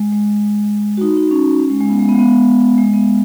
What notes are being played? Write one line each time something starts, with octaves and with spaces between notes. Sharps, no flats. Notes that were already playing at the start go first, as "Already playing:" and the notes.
Already playing: G#3
G#3
F#4
D#4
D#4
C#4
C#4
G#3
G#3
C#4
B3
G#3
B3
G#3
B3
G#3
B3